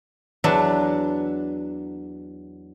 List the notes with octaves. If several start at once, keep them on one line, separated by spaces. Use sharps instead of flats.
E2 F#3 D4 B4 E5